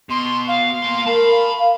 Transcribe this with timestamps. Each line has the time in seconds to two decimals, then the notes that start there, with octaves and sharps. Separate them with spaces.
0.10 B2 C6
0.48 F5
0.82 A#3 C6
1.06 A#4 A5 B5
1.58 F5